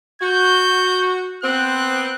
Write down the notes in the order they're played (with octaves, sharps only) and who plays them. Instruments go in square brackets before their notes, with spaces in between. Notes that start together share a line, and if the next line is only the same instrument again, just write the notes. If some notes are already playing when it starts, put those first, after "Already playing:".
[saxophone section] F#4 [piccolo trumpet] G6
[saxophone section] B3 C4 [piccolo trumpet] F#6